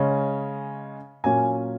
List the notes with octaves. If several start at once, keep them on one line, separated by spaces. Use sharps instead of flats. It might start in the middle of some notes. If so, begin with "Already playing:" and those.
Already playing: C#3 G#3 C#4
A#2 F#3 A#3 C#4 G#5